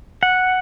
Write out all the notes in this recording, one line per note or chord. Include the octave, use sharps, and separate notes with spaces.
F#5